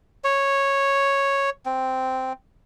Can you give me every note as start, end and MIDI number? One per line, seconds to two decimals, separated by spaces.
0.24 1.50 73
1.66 2.33 60